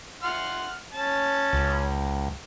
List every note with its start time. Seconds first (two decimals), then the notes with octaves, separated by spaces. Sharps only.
0.23 F#5 C6 F6
0.93 C#4 A5
1.53 C#2